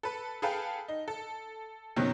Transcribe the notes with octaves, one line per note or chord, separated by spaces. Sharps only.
A4 B4
G#4 A4 B4 F5 G5 A5
D#4
A4
F#2 B2 D#3 F#3 C4 C#4